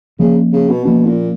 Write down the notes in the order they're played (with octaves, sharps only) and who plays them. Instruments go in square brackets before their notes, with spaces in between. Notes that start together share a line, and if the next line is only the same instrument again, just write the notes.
[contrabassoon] C#3 [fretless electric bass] F3 A#3 C#4
[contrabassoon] C#3
B2
[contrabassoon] B2 [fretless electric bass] F3 A#3 C#4
[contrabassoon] A#2